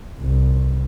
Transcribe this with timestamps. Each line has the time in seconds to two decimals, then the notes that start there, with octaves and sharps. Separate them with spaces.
0.19 C2